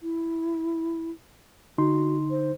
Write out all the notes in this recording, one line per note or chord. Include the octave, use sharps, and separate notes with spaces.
E4
D3 D#4 F#4 C6
C5